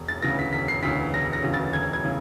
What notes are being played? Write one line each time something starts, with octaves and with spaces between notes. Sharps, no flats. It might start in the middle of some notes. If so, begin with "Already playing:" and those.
Already playing: E1
A6
D2 C#3 E3 A#6
B6
E1 B6
C7
D2 C#3 E3 B6
E1 A#6
A#6
D2 C#3 E3
A6
E1 G#6
G#6
C#3 E3